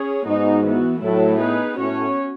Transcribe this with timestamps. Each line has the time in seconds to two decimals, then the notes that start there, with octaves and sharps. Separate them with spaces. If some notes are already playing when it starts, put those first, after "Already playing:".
Already playing: C#4 G#4 C#5
0.26 G#2 B3 D#4 F#4
0.64 E3 B3 F#4
1.02 A2 F#3 A3 E4 A4
1.40 B3 D#4 G#4 B4
1.78 A2 C#4 F#4 C#5